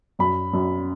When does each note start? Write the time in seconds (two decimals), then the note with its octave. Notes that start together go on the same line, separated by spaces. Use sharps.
0.19 F#2 B5
0.53 F#2